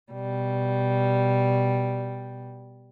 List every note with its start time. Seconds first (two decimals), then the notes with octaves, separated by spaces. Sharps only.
0.12 B2 G3